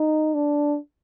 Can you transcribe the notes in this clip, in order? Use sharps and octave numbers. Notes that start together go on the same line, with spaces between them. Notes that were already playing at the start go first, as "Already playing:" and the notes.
Already playing: D#4
D4